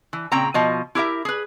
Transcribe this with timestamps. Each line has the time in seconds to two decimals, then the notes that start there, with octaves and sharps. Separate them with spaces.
0.13 E3
0.32 A#2 C#3 C4 G5 A#5
0.54 B2 F3 D#5
0.95 E4 G4 A#4 E5
1.25 G#4 B4